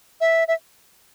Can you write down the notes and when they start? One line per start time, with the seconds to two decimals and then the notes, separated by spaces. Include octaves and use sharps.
0.21 E5
0.48 E5